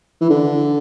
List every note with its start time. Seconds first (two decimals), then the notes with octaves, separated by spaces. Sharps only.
0.21 E3
0.30 D3